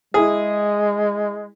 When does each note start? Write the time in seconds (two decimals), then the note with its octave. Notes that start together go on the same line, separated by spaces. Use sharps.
0.14 G#3 E4 G#4